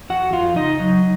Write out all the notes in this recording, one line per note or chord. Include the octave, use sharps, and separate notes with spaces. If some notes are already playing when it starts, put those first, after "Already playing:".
F2 F#4 F#5
F2 F4 F5
C#3 D#4 D#5
F#3